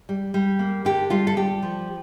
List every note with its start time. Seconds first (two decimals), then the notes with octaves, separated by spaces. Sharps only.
0.09 G3
0.34 G3
0.59 A#3
0.85 D3 G4
1.10 G3 F4
1.27 A4
1.37 G3 G4
1.62 F3